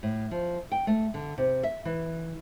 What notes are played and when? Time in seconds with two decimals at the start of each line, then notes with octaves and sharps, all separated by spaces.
0.03 A2
0.31 F3
0.72 G5
0.87 A3
1.14 D3
1.38 C3
1.63 E5
1.85 E3